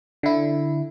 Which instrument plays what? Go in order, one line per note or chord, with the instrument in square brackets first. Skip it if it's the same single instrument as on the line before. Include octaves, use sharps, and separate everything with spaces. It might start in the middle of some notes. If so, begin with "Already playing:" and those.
[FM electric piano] D3 E4